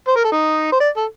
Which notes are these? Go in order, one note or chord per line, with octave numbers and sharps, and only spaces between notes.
C5
A#4
A4
D#4
C5
D5
A4